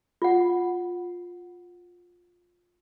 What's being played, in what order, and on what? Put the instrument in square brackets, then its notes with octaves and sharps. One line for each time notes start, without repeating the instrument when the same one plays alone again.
[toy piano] F4 F#5